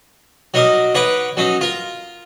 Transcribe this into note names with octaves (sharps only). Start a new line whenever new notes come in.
F#3 D#4 A#4 D#5 D6
D#4 B4 C#5 F#5 B5 D6
F#3 C#4 D#4
F4 A#4